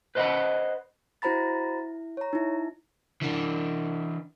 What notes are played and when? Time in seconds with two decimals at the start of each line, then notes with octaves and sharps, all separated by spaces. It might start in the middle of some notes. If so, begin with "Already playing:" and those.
0.15 B4 C5 D#5 F5 F#5 B5
1.22 E4 F#4 C5 A#5 B5 A6
1.78 E4
2.17 C#5 A#5
2.33 D#4 E4
3.22 E3 D4